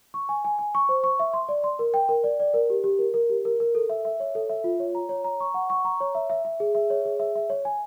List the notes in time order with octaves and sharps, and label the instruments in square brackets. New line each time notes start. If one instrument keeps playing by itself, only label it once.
[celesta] C#6
G#5
G#5
G#5
C#6
C5
C#6
E5
C6
D5
C6
A#4
G5
A#4
D5
D5
A#4
G4
G4
A#4
A#4
G4
A#4
A#4
A4
E5
E5
C#5
A4
E5
F4
C#5
A#5
C#5
A#5
C#6
F#5
C#6
A#5
C#5
E5
E5
E5
G#4
E5
C#5
G#4
E5
E5
C#5
G#5